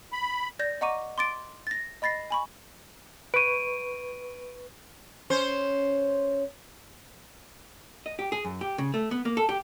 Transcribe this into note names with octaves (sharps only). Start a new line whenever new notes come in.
B5
D5 G6 A#6
D#5 F#5 A#5 C#6 D6 D#7
C6 D6 A6 D7
A6 A#6
D#5 B5 A6 A#6 C7
G#5 B5 C#6
B4 C#6 D7 D#7
C#4 C5
D#5
G4
G#4
F#2
G4
C#3
A3
B3
A#3
A4
G4